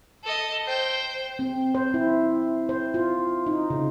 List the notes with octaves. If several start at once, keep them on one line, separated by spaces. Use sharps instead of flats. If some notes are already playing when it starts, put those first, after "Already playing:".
A4 D#5
C5 G5
C4
C5
E4
C5
F4
D#4
C#3